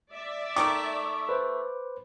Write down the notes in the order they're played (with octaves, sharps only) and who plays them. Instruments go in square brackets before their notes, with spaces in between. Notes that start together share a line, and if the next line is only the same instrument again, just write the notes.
[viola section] D5 E5
[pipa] D#3 A3 A#4 [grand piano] D6
[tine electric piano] B4 C5